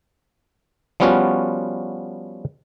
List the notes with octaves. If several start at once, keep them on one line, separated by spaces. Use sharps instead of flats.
F3 G3 B3 C#4 F4 F#4